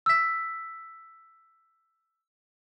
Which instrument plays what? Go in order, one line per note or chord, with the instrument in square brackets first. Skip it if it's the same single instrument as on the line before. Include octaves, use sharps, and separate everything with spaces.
[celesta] E6 B6